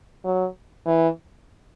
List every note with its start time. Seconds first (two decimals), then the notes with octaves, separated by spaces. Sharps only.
0.24 F#3
0.86 E3